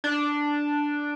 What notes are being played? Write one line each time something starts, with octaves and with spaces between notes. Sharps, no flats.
D4